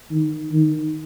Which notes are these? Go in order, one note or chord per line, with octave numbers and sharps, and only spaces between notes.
D#3
D#3